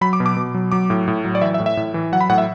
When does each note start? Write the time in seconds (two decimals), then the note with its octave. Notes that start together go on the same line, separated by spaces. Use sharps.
0.01 F#3 B5
0.13 D6
0.20 B2
0.26 D6
0.36 B2
0.54 F#3
0.72 F#3 D6
0.90 A2
1.08 A2
1.25 F#3
1.35 D5
1.41 E3 E5
1.54 E5
1.60 A2
1.66 E5
1.77 A2
1.94 E3
2.12 F#3 F#5
2.21 B5
2.29 A2 F#5
2.38 E5